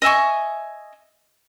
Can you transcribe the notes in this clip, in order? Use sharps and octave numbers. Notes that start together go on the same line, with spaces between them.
D#5 E5 G#5 C#6